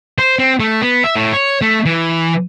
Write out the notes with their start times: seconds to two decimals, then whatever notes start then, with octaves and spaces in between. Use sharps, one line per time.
0.18 C5
0.39 C4
0.60 A3
0.82 B3
1.04 E5
1.16 A2
1.33 C#5
1.61 A3
1.86 E3